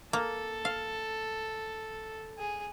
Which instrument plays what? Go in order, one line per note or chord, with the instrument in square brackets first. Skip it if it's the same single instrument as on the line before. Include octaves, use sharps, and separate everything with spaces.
[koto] A#3 [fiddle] A4
[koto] F5
[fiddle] G#4